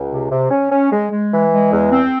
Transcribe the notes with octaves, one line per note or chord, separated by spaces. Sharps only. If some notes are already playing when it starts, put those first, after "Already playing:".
Already playing: C#2
C3
C3
C#4
C#4
G#3
G#3
E3
G#3
E2
C4